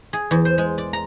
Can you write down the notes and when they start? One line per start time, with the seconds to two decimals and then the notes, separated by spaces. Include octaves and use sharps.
0.13 G#4
0.31 E2
0.45 C5
0.58 G#3
0.78 D5
0.93 A#5